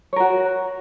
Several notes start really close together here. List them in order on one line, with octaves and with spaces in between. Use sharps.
C#5 A#4 F#4